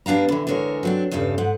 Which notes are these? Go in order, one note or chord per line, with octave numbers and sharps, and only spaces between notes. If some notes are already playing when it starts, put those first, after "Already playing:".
G3 B3 D4 F5 A#5
D3 E3
D3 E3 G#3 A#4 C#5
F#3 C4 D4
E2 G2 C#3 G3 A4
G#2 F#5